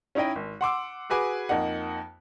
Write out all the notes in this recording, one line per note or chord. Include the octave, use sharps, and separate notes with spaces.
C#4 D#4 E4 D#5 G5
G#1
F#5 C6 D6 E6
F#4 G#4 B4 G#5 D6
F2 A#3 D#4 F#5